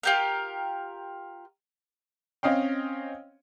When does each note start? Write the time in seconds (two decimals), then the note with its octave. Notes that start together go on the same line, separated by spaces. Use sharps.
0.03 F4 G4 A#4
2.43 C4 C#4 D#5 F5 G5